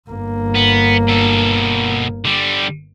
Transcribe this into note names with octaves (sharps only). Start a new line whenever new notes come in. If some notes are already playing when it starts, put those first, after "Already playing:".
G1 A#3
B3
B2 A4
D3 G3